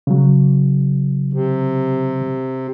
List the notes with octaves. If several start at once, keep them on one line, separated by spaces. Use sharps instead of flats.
C#3 F#3
C3